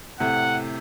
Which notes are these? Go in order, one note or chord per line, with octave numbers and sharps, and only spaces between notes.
A2 C3 F#5